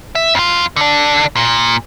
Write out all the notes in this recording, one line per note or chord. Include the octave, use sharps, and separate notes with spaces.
E5
F2 F4
D3 D4
A#2